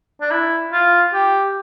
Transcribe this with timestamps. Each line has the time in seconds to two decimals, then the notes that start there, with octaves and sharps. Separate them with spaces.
0.21 D4
0.31 E4
0.72 F4
1.13 G4